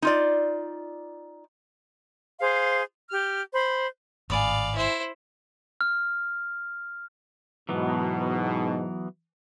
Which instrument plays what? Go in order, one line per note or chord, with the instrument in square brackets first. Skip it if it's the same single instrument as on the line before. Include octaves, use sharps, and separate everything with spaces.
[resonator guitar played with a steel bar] D#4 F4 D5
[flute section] G#4 C5 F5
G4 F6
C5 B5
[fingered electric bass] G#1 A2 [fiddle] D5 F5 [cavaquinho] G#5 B5 D#6
[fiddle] E4 C5
[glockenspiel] F6
[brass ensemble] G#2 B2 [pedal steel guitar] E3 F#3 B3